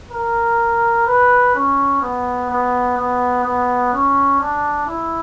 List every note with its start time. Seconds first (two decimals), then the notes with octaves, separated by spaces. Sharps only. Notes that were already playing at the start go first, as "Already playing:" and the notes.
0.11 A#4
1.07 B4
1.55 C#4
2.02 B3
2.50 B3
2.97 B3
3.44 B3
3.93 C#4
4.40 D4
4.87 E4